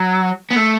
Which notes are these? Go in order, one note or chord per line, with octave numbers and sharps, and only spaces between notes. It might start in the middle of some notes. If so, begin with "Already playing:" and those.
Already playing: F#3
B3
A3